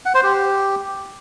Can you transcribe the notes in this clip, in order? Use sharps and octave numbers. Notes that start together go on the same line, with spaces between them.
F#5
C5
G4